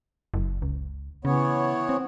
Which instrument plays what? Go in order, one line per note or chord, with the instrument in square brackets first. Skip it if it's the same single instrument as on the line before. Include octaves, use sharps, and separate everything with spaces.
[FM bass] F#1
C#2
[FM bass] C#3 [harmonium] E3 B3 C#5
[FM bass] C4